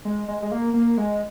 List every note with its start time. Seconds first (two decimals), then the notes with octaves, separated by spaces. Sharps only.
0.05 G#3
0.28 G#3
0.42 G#3
0.51 A#3
0.74 A#3
0.98 G#3